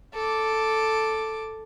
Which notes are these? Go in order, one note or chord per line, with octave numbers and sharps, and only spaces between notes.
A4 D6